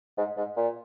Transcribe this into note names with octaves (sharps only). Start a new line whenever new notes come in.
G#2
G#2
A#2